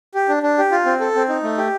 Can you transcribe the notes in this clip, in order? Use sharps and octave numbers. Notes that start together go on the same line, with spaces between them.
G4
D4
D4
G4
F4
C4
A4
C4
D#4
A3
G4